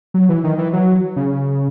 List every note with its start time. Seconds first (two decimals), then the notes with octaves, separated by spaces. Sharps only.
0.14 F#3
0.29 E3
0.44 D#3
0.58 E3
0.73 F#3
1.16 C#3